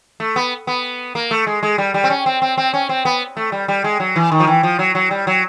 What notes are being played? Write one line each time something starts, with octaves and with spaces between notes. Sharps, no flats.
A3
B3
B3
A#3
A3
G#3
G#3
G3
G3
C4
C#4
C4
C4
C4
C#4
C4
B3
A3
G3
G3
G#3
F#3
E3
D#3
F3
E3
F3
F#3
F#3
G3
F#3